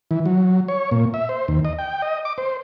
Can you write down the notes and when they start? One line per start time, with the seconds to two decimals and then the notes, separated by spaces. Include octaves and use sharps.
0.11 E3
0.26 F#3
0.68 C#5
0.91 A#2
1.14 E5
1.29 C5
1.48 D#2
1.65 D#5
1.79 G5
2.02 D#5
2.25 D6
2.38 C5